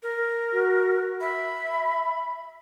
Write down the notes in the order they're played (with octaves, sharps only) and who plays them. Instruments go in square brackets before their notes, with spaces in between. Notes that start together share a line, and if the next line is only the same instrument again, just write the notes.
[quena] A#4
[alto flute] F#4
[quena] E5 [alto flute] B5